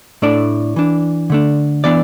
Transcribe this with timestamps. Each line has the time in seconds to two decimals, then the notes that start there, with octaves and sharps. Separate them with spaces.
0.22 A2 A3 D4 D5
0.76 E3 D4
1.30 D3 A3 D4
1.84 E3 B3 D4 D5